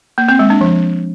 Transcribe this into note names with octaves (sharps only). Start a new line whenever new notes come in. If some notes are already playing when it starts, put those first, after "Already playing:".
A#3
C4
G#3
D4
F3